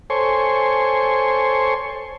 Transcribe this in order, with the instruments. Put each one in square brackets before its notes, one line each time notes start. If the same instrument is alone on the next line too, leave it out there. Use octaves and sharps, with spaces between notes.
[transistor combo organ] A4 C5 C#5 G#5 C6 C#6